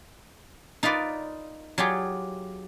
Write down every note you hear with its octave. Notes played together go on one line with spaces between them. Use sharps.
D#4 F4 A#4 B4 D5
F#3 F4 G4 G#4